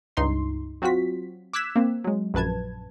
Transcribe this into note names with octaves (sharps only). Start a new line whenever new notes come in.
C#2 G2 D#4 C6 C7
F#3 C4 F4 F#4 B6
D6 E6 F#6 G#6 B6 E7
A#3 C4
F#3 G#3
A#1 F#2 B4 A5 G#6